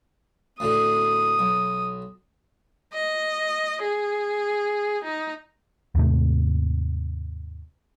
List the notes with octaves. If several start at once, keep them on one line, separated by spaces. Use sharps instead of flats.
D2 A2 D3 D#6
B1
D#5
G#4
D#4
D#2 G#2 C3 A3